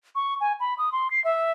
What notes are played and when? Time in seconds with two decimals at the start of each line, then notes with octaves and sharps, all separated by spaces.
0.15 C#6
0.41 G#5
0.60 B5
0.78 D#6
0.92 C6
1.11 C7
1.24 E5